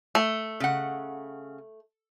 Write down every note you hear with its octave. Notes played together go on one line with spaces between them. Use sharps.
A3
C#3 F#5